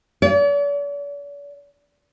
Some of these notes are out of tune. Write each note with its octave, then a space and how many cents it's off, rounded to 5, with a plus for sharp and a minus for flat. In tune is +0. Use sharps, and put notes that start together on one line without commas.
D5 -45